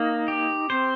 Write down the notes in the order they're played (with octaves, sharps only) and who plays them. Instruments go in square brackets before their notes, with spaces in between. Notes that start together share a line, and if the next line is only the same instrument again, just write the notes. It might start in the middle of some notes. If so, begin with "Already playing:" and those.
Already playing: [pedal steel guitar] A#3 [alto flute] D#4
[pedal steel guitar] G4
[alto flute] C4 [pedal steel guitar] C5